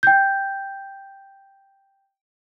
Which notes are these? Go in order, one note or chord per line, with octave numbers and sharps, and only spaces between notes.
G5 G6